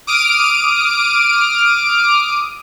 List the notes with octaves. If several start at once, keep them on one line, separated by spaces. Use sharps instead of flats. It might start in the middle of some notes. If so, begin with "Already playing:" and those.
D6 D#6 F6 D7